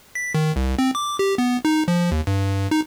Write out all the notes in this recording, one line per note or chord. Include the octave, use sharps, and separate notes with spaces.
B6
D#3
C2
C4
D6
G4
B3
D#4
F3
D#2
G2
D#4